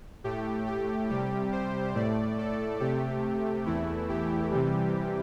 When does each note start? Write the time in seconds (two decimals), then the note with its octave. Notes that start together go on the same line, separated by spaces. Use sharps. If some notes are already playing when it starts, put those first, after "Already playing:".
0.24 A2 A3 G4
0.67 G4
1.09 C3 G3 G4
1.52 C5
1.95 A2 A3 D5
2.38 A4
2.80 C3 A3 G4
3.66 E2 E3 A3 E4
4.09 G4
4.52 C3 E3 G3